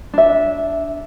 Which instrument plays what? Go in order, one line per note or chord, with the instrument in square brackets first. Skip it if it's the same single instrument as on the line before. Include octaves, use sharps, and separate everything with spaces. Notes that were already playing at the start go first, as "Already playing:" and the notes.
[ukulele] D4 E5